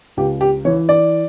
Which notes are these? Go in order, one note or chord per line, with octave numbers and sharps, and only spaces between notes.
C#2 G4
G4
E3 C#5
D5